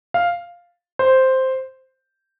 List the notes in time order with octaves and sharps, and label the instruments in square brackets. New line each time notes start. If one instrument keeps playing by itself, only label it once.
[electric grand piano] F5
C5